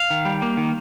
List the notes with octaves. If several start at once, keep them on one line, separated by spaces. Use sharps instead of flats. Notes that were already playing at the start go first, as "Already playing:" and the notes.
Already playing: F5
D#3
G3
A#3
D#3